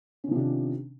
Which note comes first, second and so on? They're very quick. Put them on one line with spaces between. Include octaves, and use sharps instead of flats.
C#4 D#3 F3 C3 D4